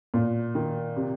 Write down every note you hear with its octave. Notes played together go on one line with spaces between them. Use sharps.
A#2
D#3
C3